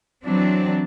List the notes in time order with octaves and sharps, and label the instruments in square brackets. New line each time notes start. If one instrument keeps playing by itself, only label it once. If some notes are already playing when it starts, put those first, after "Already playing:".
[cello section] E3 F#3 C4 D4